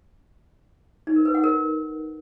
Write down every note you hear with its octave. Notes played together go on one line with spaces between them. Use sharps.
D#4
A#4
B4
F#5
A#4